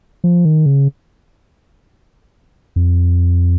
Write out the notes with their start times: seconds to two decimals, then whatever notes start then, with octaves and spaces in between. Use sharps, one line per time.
0.24 F3
0.45 D#3
0.66 C#3
2.76 F2